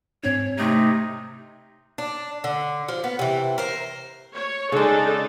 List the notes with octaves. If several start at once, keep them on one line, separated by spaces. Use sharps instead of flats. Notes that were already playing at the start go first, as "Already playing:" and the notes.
G#2 C4 D4 C#5
C3 A3 D#4
D4
D3
F3
B3
C3 E3
A#4 C5
C#5
C#3 G#3 D4 D#4 A4